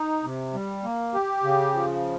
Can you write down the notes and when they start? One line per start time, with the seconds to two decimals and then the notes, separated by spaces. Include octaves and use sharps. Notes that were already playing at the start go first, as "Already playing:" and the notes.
Already playing: D#4
0.24 C3
0.54 G3
0.84 A#3
1.14 G4
1.44 C#3
1.74 F3